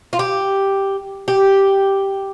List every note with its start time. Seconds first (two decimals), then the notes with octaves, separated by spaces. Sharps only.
0.13 F4
0.19 G4
1.28 G4